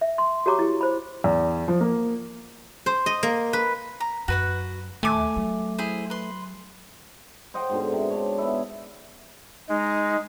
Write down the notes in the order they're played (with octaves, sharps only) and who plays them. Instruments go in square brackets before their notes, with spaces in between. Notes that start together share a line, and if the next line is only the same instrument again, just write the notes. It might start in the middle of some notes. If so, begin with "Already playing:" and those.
[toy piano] E5
C6
F#4 G4 C#5 A#5 C#6 D6
E4 G4
C5 B5
[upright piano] E2
F3
A#3
[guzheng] C5
D#5
A#3
B4
[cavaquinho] A#5
[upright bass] F#2 [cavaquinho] F#4 B4 F#5
[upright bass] D#2 [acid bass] A3 [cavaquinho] G#5 D6
[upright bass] F#3
[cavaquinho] E4 G#4 C5
B4 C6
[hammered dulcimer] C5 D#5 F#5 G5
G#2 B2 D3
C3
D4 C#5
B3 E4
[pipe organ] G#3 [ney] D#4